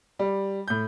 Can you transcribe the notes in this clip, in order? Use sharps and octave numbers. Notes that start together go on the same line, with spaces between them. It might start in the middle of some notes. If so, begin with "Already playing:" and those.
G3
A2 G6